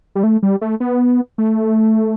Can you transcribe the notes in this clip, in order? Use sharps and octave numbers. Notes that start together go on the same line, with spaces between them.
G3
A3
G3
A3
B3
A3